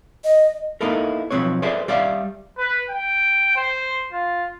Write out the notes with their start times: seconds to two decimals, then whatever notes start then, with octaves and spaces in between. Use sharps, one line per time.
0.24 D#5
0.81 A#3 B3 D#4 E4 A4 A#4
1.31 B1 A#2 F3 C4 B4 C#5
1.62 G#4 A4 B4 C5 D5 E5
1.88 G3 D5 E5 F5
2.58 B4
2.90 G5
3.56 C5
4.13 F4